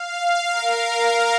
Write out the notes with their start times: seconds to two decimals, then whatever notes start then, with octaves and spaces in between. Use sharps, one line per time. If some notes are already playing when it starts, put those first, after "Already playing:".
Already playing: F5
0.50 A#4